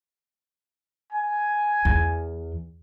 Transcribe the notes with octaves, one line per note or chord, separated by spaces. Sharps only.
G#5
E2